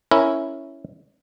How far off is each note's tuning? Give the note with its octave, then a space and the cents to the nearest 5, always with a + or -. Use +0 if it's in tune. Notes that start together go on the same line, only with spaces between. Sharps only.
C#4 +0 E4 +0 A#4 +0